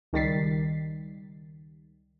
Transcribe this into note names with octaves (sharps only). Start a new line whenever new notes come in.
C#2 D#3 G3 A6 B6 C7